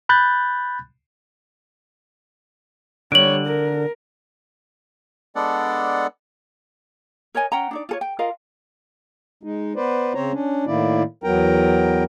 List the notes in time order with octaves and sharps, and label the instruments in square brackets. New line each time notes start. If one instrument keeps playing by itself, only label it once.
[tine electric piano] B5 F#6 G6 A6
[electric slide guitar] D3 [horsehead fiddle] G3 C#5 [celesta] D7 F#7
[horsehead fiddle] A#4
[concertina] G#3 B3 D4 A4 D5 F#5
[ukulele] A#4 C#5 D#5 G#5
C#4 F#5 G5 A#5
D4 D#4 D5
F4 A4 C#5
G5
F4 A#4 D#5 F5
[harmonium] G#3 D#4
B3 B4 C5 D5
C#3 C4 C5 C#5 A#5
C#4 D4
A2 D#3 A#3 E4 D5
E2 F#3 B3 A#4 G5 A#5